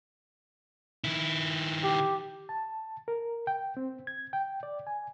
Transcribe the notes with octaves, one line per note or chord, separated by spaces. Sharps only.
D#3 E4
G4
A5
A#4
G5
C4
G#6
G5
D5
G#5